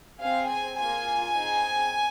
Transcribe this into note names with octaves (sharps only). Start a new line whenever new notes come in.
C4 G#4 F5
G#5
A#3 F4 G#4 G#5
C4 D#4 G#4